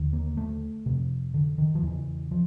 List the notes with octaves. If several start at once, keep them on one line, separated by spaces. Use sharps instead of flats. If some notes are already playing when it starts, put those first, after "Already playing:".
Already playing: D#2 D3
A#3
A3
F2 C3
D3
D#3
F3
E2 C#3 E3
F3